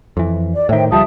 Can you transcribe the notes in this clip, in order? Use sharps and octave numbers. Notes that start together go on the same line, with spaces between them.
F2 E3
D5
A2 D#3 C5 E5 G5
C#2 F3 G3 E5 A5 D#6